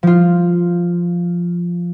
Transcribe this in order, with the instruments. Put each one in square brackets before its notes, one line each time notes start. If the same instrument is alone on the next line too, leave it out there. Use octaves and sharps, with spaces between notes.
[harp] F3 F4